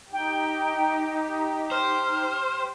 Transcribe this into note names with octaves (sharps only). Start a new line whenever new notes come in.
D#4 G4 G5
C5 F6